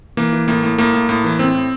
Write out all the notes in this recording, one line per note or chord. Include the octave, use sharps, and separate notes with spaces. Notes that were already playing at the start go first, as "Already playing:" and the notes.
E3 A#3
E3
A2 A#3
A2
A2 A#3
A2
A2
E3
A2 C4
A2